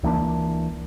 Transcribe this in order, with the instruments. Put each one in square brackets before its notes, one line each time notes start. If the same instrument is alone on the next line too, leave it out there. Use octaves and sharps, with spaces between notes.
[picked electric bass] C#2 E3 A#3 D4